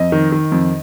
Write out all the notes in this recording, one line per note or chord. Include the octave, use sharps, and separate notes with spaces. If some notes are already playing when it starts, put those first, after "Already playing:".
Already playing: F2 D#5
D#3
D#3
F2